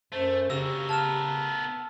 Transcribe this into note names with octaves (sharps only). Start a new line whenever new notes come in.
F#2 A3 C5
C#3 A#3 F#4 G4 E6
B3 A#4 A5 F6 E7